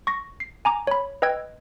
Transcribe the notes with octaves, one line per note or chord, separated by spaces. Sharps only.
C#6 A#6
C7
G#5 A#5 D6
C#5 B5
B4 D#5 G5 E6 G#6